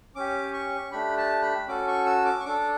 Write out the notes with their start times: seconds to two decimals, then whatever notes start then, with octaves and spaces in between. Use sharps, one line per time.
0.16 C#4 G4 D6
0.54 C#6
0.92 A3 D4 G4 B5
1.18 A5
1.42 B5
1.68 C#4 F#4 A4 D6
1.87 C#6
2.06 E6
2.25 D6
2.40 C#6
2.45 D4 A4 D6